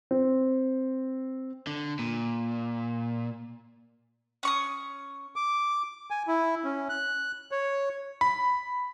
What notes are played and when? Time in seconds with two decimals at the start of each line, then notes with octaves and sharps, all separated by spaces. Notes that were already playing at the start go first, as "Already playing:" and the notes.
0.11 C4
1.67 D3
1.99 A#2
4.43 C#4 C#6 D#6
5.36 D6
6.11 G#5
6.27 E4
6.64 C#4
6.89 F#6
7.52 C#5
8.21 B5